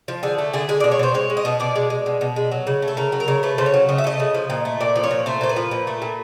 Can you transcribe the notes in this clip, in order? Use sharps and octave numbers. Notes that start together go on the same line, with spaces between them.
F3
D3 G#4
A3
D3 G#4
G#3 G#4
D5
B2
C#5
B2 C5
G#3 C#5
G#3
D#5
B2
B2 D5
G#3
G#3
B2
B2
G#3
F#3
C#3
A3
A4
C#3 A#4
F#3
A#4
C#3
A3 B4
C#3 C5
C#5
F#3
C#3 D#5
E5
A3 D#5
C#3
F3
A#2
A3
A#2 D5
F3
C#5
A#2
A3 C5
A#2 C5
B4
F3
A#2
A3
A#2